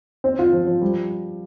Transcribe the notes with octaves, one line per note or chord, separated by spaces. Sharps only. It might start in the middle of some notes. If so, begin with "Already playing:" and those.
C4
F4
F3
F3
G3